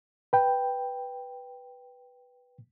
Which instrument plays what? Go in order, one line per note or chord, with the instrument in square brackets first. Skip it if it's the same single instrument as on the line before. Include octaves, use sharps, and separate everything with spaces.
[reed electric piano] B4 G5